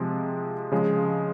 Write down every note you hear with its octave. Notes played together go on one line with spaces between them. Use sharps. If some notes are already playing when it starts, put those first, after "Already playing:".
Already playing: C3 F3 G#3
C#3 F3 G#3